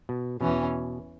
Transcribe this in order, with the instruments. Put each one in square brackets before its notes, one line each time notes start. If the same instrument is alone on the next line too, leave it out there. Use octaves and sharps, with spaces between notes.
[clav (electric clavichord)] B2
[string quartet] E2 E3 C#4 [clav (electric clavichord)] B2